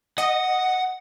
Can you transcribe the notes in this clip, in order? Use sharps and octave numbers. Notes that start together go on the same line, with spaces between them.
D#5 F#5